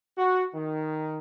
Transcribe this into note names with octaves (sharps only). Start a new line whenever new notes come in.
F#4
D#3